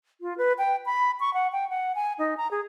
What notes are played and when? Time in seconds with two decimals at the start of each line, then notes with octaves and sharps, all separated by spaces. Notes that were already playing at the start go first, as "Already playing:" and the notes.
0.21 F4
0.38 B4
0.58 G5
0.86 B5
1.20 C#6
1.34 F#5
1.52 G5
1.69 F#5
1.95 G#5
2.19 D#4
2.37 A#5
2.51 G#4